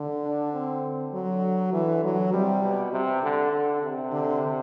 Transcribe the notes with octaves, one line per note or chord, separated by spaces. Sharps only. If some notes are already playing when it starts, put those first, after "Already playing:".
Already playing: D3
D4
C4
D3 F#3
D3 E3
F#3
C3 G3
B2
C3
D3
D3
C3
D3